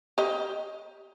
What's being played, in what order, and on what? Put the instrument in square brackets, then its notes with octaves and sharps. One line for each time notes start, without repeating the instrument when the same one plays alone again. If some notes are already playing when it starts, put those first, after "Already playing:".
[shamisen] G4 D#5